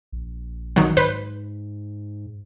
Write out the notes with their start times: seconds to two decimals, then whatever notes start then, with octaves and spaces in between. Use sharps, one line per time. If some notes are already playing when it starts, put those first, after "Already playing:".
0.12 A#1
0.76 D#3 F#3
0.97 G#2 B4 C5